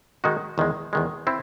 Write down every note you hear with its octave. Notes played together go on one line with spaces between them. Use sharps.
D#3 G#3 D#4 F#4
E2 D#3 G#3
E2 D#3 G#3
C4 E4